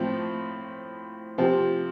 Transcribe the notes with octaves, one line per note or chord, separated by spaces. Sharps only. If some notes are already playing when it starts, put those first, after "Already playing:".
Already playing: A2 F3 C4
C3 F3 C4